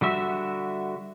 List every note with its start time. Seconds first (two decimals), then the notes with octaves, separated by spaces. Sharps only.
0.01 D3 G3 F#4 E5